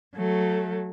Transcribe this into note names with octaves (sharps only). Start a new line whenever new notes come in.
F#3 A3